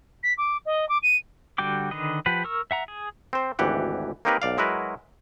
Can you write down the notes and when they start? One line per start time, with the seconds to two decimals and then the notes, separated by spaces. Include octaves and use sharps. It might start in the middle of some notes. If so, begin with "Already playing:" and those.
0.23 B6
0.37 D6
0.65 D#5
0.89 D6
1.02 D#7
1.58 D3 G3 F#4 G5 D6
1.91 D3 D#3 B4 D#5
2.26 F3 G4 B4 F#5
2.45 A#4 C#6 E6
2.71 E5 F#5 A#5
2.88 G#4
3.33 C4 C5
3.59 G#1 D2 E3 G4 F#5
4.25 A#3 C4 D#4 G4 A#4 B4
4.42 B1 D5 F5
4.58 F#3 G#3 E4 F#4 A#4 B4